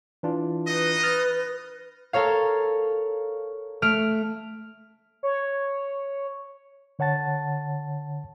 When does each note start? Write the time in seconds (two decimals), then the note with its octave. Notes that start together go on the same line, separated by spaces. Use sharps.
0.23 E3 D4 F4
0.68 D#4 B4 D#5
1.03 F6 A6
2.13 A4 A#4 C#5 F5
3.82 A3 F6 D7
5.23 C#5
6.99 D3 C#5 F#5 A5 A6